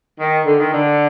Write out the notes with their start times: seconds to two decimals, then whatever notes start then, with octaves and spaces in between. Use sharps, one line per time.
0.20 D#3
0.46 D3
0.59 D#3
0.73 D3